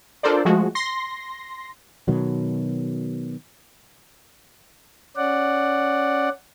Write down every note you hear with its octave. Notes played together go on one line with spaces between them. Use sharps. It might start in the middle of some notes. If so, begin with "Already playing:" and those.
D4 F4 A4 A#4 C5 D5
F3 G#3 A3 F#4
C6 A#6
B2 D#3 F#3
C#4 D5 F#5